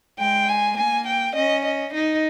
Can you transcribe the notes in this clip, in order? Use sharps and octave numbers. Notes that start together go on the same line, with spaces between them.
G#3 G5
G#5
A#3 G#5
G5
C#4 D#5
D#5
D#4 D#5